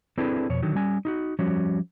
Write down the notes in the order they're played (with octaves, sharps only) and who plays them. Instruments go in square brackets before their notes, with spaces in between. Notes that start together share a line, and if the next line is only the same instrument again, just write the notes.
[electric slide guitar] C4 D4 E4 G#4 A4 B4
F2 B2 C#5
D3 D#3 F#3
G3 C#4 G#5
D#4 F4 F#4
F3 G3 C#4 F#4 C#5